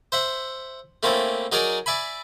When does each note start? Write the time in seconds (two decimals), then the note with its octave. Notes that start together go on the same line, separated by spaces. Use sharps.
0.12 C5 E5 F#5
1.03 A3 A#3 C4 C#4 E4 A4
1.52 F#3 D#4 G#4 A#4 D5 G#5
1.86 D5 E5 G#5 B5